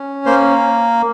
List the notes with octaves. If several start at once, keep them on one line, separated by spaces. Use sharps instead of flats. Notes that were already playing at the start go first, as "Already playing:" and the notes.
Already playing: C#4
A#3 C5